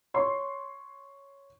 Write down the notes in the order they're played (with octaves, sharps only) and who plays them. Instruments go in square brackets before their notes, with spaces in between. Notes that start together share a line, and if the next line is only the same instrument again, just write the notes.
[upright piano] C#5 C6